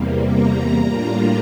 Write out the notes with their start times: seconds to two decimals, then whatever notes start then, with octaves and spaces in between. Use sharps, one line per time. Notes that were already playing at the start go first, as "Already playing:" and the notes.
Already playing: E2 C3 G3 A#3
0.24 A#5
0.80 A2 G3 A#3 D4 F4